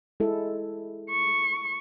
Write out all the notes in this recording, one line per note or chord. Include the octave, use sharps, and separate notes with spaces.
G#3 E4 A4
C#6